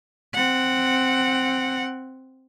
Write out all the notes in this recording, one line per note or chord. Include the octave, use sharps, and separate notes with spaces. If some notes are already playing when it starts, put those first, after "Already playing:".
C4 F#5